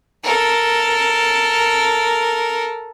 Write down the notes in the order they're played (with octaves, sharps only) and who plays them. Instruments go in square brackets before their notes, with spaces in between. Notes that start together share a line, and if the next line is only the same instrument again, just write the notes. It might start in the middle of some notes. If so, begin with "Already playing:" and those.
[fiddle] A4 A#4